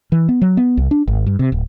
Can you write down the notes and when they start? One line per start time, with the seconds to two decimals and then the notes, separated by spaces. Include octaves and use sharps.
0.12 E3
0.29 B3
0.42 F#3
0.57 B3
0.77 C2
0.91 D4
1.08 G#1
1.26 G2
1.39 C3
1.52 D1